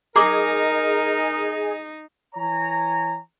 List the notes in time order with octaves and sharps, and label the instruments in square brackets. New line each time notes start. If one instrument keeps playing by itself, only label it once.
[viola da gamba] D#4 [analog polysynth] G#4 D#5 [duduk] A#4 [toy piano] A#5 D6
[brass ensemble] E3 C#5 G#5 A#5